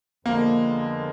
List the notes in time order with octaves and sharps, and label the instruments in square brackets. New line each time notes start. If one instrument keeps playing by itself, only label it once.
[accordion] F2 D3 F3 G#3 B3 [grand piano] A#3